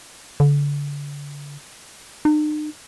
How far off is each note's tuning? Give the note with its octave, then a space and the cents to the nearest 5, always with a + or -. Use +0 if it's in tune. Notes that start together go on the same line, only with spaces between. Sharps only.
D3 -35
D#4 -45